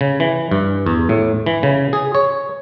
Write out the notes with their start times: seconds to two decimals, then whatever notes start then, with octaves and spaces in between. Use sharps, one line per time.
0.01 C#3
0.20 E3
0.51 G2
0.86 E2
1.09 A2
1.46 E3
1.63 C#3
1.93 G#4
2.15 C#5